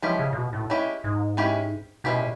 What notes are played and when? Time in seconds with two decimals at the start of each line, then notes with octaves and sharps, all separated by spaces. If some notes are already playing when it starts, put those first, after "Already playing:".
0.02 F3 G#3 C#4 E4 G4
0.19 C#3
0.33 A#2
0.36 B2
0.53 A2
0.70 G#3 C#4 E4 G4
1.04 G#2
1.37 G#3 C#4 E4 G4
2.04 B2 G#3 C#4 E4 G4
2.20 A#2